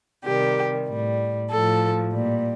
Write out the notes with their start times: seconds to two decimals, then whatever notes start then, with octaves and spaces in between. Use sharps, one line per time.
0.24 C3 D#3 G3 G4
0.87 A2 G3
1.50 A2 F3 A4
2.13 A#2 G3